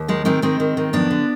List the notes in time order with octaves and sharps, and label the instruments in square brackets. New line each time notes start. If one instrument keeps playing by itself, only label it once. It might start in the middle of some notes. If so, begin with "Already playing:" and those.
Already playing: [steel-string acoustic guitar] D#2
D#3 G#3
D#3 G#3 C4
D#3 G#3 C4
D#3
D#3
F2 B3 D4
D3